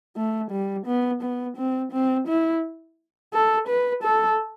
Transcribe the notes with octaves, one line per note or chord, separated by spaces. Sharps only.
A3
G3
B3
B3
C4
C4
E4
A4
B4
A4